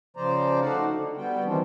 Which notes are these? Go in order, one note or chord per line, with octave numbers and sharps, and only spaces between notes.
C#3 F3 C5 D5 A#5
A3 D#4 F#4 D5 F5 F#5
D3
G3 B3 F#4 G5
D#3 E3 G3 C4 D4